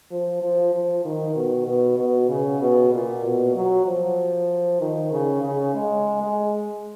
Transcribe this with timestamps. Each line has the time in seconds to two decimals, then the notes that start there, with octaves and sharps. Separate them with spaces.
0.11 F3
0.42 F3
0.73 F3
1.05 D#3
1.36 B2
1.67 B2
1.99 B2
2.29 C#3
2.61 B2
2.93 A#2
3.24 B2
3.55 F#3
3.86 F3
4.81 D#3
5.12 C#3
5.43 C#3
5.74 G#3
6.22 G#3